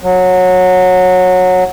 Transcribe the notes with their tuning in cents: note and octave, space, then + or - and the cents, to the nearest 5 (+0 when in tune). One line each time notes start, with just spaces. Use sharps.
F#3 -15